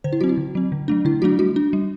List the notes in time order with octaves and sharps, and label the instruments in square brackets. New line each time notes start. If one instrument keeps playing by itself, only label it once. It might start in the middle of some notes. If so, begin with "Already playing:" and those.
[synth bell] D3 C5
E4
F#3 C4 F#4
E4
D3
F#3 C4
D3
F#3 A3 D4
D3 E4
F#3 A3 D4 F#4
G3 F#4
D4
G3